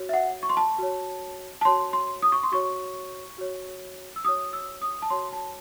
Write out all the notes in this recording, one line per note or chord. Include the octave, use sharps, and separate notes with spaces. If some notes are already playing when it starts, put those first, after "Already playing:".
Already playing: F#4 C#5
E5
F#5
C#6
C6
A5
F#4 C#5
A5
F#4 C#5 C6
C6
D#6
C#6
C6
F#4 C#5 C#6
F#4 C#5
E6
F#4 C#5 D#6
E6
D#6
A5
F#4 C#5 C6
A5